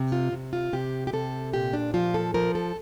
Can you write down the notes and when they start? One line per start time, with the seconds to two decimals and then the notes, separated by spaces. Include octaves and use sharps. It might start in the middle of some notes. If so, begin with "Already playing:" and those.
Already playing: C3
0.12 F4
0.32 C3
0.53 F4
0.73 C3 G4
1.07 G4
1.13 C3 A4
1.53 A#2 G4
1.73 D4
1.94 F3 F4
2.14 A4
2.34 F3 A#4
2.55 A4